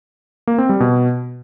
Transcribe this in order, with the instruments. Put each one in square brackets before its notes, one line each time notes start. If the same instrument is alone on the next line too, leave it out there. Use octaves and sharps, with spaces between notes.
[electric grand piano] A#3
C4
G3
B2